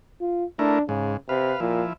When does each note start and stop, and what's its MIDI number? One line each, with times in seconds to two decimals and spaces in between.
0.21 0.45 65
0.59 0.79 57
0.59 0.83 62
0.59 0.79 64
0.59 0.79 70
0.89 1.17 44
0.89 1.14 49
1.29 1.54 48
1.29 1.60 71
1.29 1.60 77
1.60 1.83 46
1.60 1.93 53
1.60 1.93 64